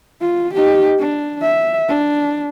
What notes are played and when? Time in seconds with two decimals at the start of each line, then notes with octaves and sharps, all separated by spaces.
0.21 F4
0.54 D#4 G4
0.99 D4
1.42 E5
1.89 D4